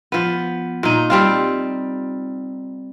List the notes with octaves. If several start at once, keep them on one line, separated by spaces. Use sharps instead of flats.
F3 B3
A#2 D#4
G3 C4 F4